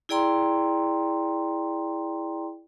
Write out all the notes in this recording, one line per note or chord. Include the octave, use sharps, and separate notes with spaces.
E4 G#4 D5 G5 A#5 C6